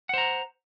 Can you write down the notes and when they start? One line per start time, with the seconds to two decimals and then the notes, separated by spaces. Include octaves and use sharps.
0.09 F#5
0.14 C5
0.18 A#5